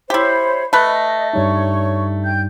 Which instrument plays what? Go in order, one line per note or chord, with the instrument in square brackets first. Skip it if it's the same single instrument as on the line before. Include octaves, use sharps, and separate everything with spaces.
[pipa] E4 G4 [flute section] C5 C#5 B5
[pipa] A3 B4 [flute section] D#5
[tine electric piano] G2 G3 D#4 [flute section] C#5 C#6
[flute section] G5 G6